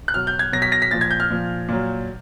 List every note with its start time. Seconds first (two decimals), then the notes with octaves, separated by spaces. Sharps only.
0.08 F#6
0.14 B2 F#3 F6
0.27 G6
0.39 G#6
0.52 B2 F#3 A#6
0.62 B6
0.72 A#6
0.82 B6
0.91 A#2 F3 A6
1.01 G#6
1.11 G6
1.20 F6
1.30 A#2 F3
1.68 A#2 F#3